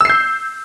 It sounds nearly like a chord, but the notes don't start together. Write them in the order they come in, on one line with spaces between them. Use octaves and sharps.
E6 C7 G6